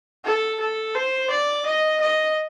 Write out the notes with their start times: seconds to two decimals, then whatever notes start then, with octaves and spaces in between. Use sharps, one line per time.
0.25 A4
0.60 A4
0.95 C5
1.30 D5
1.66 D#5
2.01 D#5